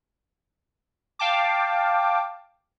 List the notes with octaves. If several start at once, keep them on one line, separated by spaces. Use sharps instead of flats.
F5 G5 A5 D6